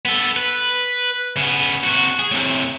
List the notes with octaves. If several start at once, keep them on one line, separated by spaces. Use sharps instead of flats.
B3 A4
B4
C#3 B3
C3 F#4
G#4
A2 C3